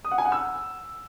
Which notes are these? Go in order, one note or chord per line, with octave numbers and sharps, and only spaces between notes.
D#6
F#5
G#5
F#5
E6